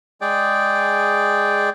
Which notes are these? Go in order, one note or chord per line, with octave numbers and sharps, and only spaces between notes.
G#3 G#4 D5 G5